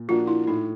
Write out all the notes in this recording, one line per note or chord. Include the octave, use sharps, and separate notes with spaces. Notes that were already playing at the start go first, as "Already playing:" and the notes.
Already playing: A#2
F3 A#3 D4 F4 F#4
E4
A2 D#4